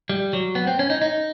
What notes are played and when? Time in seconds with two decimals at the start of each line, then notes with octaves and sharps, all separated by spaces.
0.10 G3
0.33 F#3
0.55 B3
0.67 C4
0.79 C#4
0.90 D#4
1.02 D#4